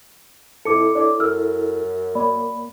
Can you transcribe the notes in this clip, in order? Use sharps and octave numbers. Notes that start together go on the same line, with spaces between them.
F2 E4 A4 D6 C#7
D4 C#5 D5 D6
F#2 E6 F6
A#3 C#5 D5 B5